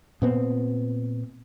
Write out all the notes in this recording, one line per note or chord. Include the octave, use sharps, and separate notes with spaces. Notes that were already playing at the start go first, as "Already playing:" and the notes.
A#2 B3 C4